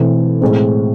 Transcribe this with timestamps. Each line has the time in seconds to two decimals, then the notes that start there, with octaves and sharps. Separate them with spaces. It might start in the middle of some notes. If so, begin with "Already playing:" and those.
Already playing: B2 E3 A3 C4
0.41 A2 G#3 C4